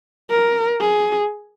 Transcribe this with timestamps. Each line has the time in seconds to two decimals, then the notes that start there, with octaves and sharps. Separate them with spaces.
0.30 A#4
0.81 G#4